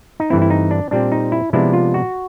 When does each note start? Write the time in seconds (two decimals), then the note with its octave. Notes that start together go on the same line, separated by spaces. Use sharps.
0.20 D#4
0.30 G2 E3 A3 C4 E4
0.42 E4
0.50 D#4
0.71 D4
0.91 A#2 G3 C4 D4
1.12 D#4
1.32 E4
1.53 C3 F3 G#3 B3 D4 E4
1.73 F4
1.94 F#4